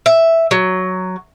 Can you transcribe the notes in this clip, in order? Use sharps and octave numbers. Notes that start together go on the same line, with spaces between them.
E5
F#3